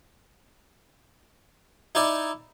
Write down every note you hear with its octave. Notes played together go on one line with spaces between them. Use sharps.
D#4 E4 D5